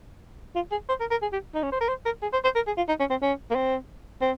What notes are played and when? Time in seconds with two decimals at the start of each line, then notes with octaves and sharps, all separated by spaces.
0.55 F4
0.71 G#4
0.89 C5
1.00 A#4
1.11 A#4
1.22 G#4
1.32 G4
1.55 D#4
1.63 C#4
1.72 C5
1.81 A#4
1.88 C5
2.05 A#4
2.22 G#4
2.33 C5
2.44 C5
2.55 A#4
2.67 G#4
2.77 F4
2.88 D#4
3.00 C#4
3.10 C4
3.22 C#4
3.51 A#3
3.55 C4
4.21 C4